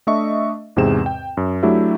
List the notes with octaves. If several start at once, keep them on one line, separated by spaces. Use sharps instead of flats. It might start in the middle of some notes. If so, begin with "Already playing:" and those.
A3 D4 D#5 E5 C#6
E2 G#2 C3 C4 G#4 E7
G5
F#2
F#3 A3 D4 E4 G4 E5